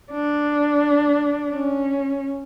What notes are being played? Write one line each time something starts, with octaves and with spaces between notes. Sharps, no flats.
D4
C#4